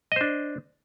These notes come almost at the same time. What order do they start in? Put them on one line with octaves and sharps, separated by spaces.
D#5 C5 D4